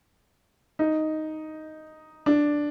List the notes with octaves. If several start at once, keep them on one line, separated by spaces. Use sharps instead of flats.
D#4
D4